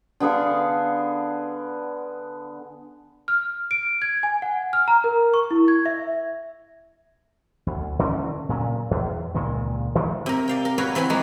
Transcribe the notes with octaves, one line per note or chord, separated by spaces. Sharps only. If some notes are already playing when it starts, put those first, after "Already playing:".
D3 B3 G#4 F5
F6
D7
G#6
G#5
F#5
F6
A#5
A#4
C#6
E4
G#6
E5
D2
D3 E3 C#4
A#2 C#3 F#3
E2
C#2 A#2 D#3 G#3
D#3 F#3 G3 A3
C3 A#4
D5 F5 G5
A#4
F#4 B4 C#5 E5 F5 G5
E3 C4 F#5 G#5 B5
F3 G#3 A#3 F#4